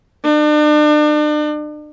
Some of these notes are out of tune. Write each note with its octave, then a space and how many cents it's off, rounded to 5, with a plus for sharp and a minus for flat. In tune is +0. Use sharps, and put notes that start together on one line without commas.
D4 +40